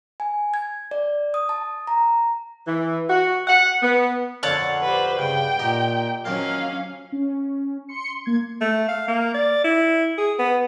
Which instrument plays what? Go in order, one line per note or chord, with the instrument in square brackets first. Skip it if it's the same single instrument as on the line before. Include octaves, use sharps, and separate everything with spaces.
[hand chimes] G#5
G#6
D5
D#6
A5
A#5
[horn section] E3
F#4
F#5
B3
[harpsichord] F2 A#2 D3 [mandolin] C#5 F#5 A5
[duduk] G4 [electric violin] B4 C5
[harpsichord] G2 [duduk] C#3 [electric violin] G5
[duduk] A#2 [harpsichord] D#4 G4
[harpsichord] D#3 F3 A#3 [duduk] F#3 [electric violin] C#4 F5
[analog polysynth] C#4
C6 C#7
A#3 G#6
[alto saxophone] A3
F5
A#3
D5
E4
G#4
B3